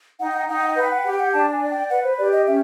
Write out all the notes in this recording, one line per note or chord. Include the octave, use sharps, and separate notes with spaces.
D#4 F#5
G5
F#5
G5
D#4 F#5
G5
F#5
G5
B4 F#5
G5
F#5
G5
G4 F#5
G5
F#5
D4 A5
G#5
D5
G5
B4 F#5
C5
G4 D5
D#5
C#4 E5